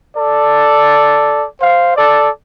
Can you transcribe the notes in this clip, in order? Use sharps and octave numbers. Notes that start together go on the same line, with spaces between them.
A4 D5
C5 F5
A4 D5